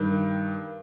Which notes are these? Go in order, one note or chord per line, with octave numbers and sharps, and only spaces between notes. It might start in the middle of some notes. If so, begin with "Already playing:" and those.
Already playing: G2 D#3